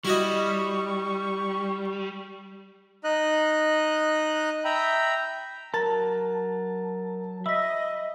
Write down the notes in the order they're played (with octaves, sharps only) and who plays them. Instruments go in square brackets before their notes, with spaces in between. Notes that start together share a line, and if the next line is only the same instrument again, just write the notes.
[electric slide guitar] G3 [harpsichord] E4 F#4 D#5 [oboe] C#6
[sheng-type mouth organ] D#4 D#5 F#6
E5 G5 A#5 B5
[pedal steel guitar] F#3 A5 [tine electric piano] A#4 A#5 A6
[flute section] D#5 [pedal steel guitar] E5 B5 [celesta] E6 B6